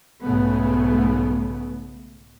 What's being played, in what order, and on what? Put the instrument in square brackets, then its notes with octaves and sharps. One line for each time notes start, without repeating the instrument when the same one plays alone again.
[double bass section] B1 G#2 C#3 A3 B3